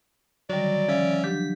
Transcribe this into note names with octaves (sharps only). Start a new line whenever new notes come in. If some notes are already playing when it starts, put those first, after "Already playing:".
D3 D#3 F#3 G3 D5
F3 C#4 E5
F#3 D4 G4 B6